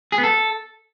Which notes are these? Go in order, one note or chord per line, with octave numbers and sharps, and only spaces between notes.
G#4
B3
A4